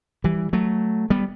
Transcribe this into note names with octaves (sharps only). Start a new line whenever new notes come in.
E3 G3
F#3 A3
G3 B3